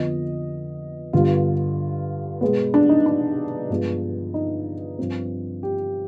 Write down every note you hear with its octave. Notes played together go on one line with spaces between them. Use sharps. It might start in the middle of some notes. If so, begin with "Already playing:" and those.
Already playing: F2 D3 F3 B3 D#5
G2 D3 G3 B3 F4
B2 G#3 B3
D4
D#4
D4
G2 F3 G#3 B3
D#4
G2 F3 C4
G4